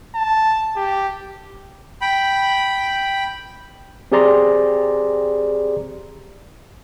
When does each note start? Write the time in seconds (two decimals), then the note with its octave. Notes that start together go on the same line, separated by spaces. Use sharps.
0.15 A5
0.77 G4
2.01 G5 B5
4.12 C4 G4 G#4 D5 A#5 C6